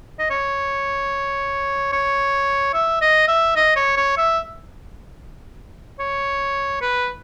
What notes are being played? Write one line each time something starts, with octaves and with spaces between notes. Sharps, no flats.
D#5
C#5
C#5
E5
D#5
E5
D#5
C#5
C#5
E5
C#5
B4